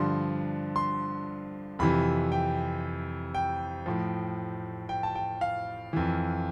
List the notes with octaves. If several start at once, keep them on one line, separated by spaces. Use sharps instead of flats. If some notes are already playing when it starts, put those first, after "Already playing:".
Already playing: G2 D3 F3 C6
C6
F2 C3 E3 B5
G5
G5
A2 F3
G5
A5
G5
F5
F2 E3